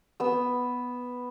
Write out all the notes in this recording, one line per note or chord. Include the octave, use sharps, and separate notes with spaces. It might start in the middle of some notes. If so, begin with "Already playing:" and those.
B3 E6